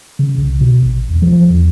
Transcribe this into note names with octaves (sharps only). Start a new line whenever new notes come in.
C#3
C2
B2
A1
E2
F3
E2